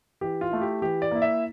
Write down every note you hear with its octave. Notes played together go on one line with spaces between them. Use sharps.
E3 G4
F4
A3 E4
G4
E3 G4
D5
A#3 E4
E5